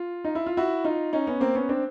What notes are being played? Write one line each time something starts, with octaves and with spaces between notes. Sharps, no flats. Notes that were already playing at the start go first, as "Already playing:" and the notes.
Already playing: F4
D#4
E4
F4
E4 F#4
D#4 F4
C#4 D#4
B3 C#4
A#3 C4
B3 C#4
C4 D4